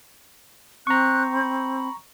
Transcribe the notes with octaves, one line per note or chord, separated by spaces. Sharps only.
C4 A#5 C#6 F#6
B5